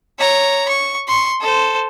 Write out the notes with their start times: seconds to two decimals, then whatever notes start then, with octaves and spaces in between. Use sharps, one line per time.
0.18 C#5 A#5
0.69 C#6
1.07 C6 C#6
1.41 A4 C5